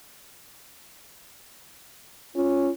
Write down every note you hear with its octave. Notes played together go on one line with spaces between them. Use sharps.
C#4 F4